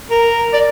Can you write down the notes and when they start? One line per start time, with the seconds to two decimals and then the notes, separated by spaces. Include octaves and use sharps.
0.10 A#4
0.53 D5